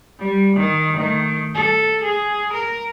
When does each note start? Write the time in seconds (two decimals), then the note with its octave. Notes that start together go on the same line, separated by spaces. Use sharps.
0.19 G3
0.57 D#3
0.94 D#3 A3
1.55 A4
2.04 G#4
2.53 A#4